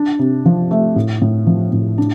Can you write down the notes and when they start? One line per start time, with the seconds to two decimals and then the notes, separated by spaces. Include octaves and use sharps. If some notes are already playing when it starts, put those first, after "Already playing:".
Already playing: D4
0.19 C3
0.45 F3
0.71 A3
0.96 A2
1.22 A2
1.47 F3
1.73 A2
1.98 D4